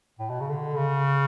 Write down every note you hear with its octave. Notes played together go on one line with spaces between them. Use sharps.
A2
B2
C#3
D3
C#3